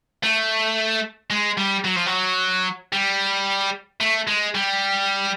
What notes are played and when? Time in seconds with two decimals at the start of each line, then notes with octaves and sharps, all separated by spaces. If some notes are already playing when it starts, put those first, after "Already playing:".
0.23 A3
1.30 G#3
1.57 G3
1.85 F#3
1.96 F3
2.06 F#3
2.93 G3
4.01 A3
4.28 G#3
4.55 G3